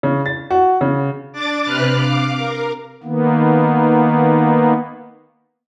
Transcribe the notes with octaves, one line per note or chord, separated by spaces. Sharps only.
C#3
A6
F#4
C#3
D4 D6 A6
C3 C4 B4 F6 F#6
F5 D6
A#4
D#3 A#3 B3